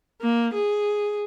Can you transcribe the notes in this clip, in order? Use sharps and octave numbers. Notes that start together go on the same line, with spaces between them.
A#3
G#4